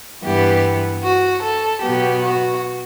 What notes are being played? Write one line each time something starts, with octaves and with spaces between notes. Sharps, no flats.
G2 E3 B3 G4
F#4
A4
B2 F#3 B3 G4
F#4